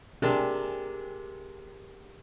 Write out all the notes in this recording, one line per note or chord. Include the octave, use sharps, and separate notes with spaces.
C3 D4 G4 G#4 A#4